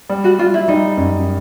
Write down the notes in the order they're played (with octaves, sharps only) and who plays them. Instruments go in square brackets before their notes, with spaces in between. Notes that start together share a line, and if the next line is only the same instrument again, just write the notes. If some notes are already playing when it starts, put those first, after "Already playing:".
[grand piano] G3
[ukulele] F#4
[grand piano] G3 [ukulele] F4
[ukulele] E4
[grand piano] G3 [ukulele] D#4
[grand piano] F#2